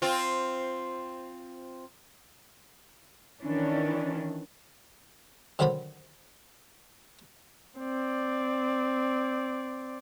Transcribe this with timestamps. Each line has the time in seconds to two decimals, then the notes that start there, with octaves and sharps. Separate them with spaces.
0.02 C4 F4
3.42 D#3 E3 C#4 D4
5.59 D3 D#3 F#3 C5 B5
7.79 C4 D5